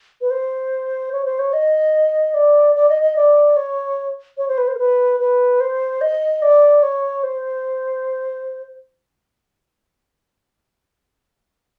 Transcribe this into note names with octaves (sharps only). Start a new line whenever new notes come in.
B4
C5
C#5
C5
C#5
D#5
D5
D5
D#5
D#5
D5
C#5
C#5
C5
B4
C5
A#4
B4
B4
C5
D#5
D5
C#5
C5